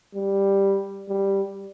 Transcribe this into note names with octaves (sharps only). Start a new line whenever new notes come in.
G3
G3